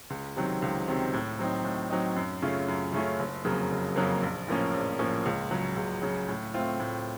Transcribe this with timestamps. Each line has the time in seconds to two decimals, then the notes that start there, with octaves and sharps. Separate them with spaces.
0.10 C#2
0.36 C3 D#3 F#3 C4
0.62 C#2
0.88 C3 D#3 F#3 C4
1.13 A2
1.39 F#3 C4 D#4
1.64 A2
1.90 F#3 C4 D#4
2.16 F#2
2.42 C#3 A3 C#4 F4
2.68 F#2
2.93 C#3 A3 C#4 F4
3.19 F#1
3.45 F2 C#3 F#3 A#3
3.71 F#1
3.96 F2 C#3 F#3 A#3
4.22 A#1
4.48 A2 F3 A#3 C#4
4.74 A#1
4.99 A2 F3 A#3 C#4
5.25 C#2
5.51 C#3 F#3
5.76 C#2
6.02 C#3 F#3
6.28 A2
6.54 A3 C4 F4
6.79 A2